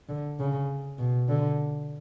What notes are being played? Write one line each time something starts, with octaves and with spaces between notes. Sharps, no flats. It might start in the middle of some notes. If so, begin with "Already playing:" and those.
D3
C#3
B2
D3